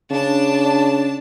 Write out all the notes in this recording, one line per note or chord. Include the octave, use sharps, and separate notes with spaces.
C#3 D4 A5